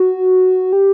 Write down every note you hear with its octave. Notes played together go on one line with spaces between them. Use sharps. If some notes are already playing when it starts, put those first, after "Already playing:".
Already playing: F#4
G4